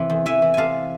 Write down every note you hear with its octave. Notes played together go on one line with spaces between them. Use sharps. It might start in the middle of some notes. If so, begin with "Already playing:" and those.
Already playing: C3 E3 E5
E2
E3 E5 G#5
E3
C3 F5 G#5 A5